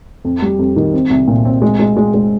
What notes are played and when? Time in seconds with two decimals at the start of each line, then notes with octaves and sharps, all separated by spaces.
0.25 F2
0.42 G3
0.59 F2
0.76 D#3
0.93 C4
1.10 C2
1.28 A#2
1.45 C4
1.62 G#3
1.80 G#3
1.97 G#3
2.14 G#3